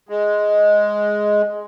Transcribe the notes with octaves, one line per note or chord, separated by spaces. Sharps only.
G#3